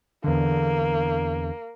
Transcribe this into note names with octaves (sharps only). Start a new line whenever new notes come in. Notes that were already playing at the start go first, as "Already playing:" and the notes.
E2 D3 A#3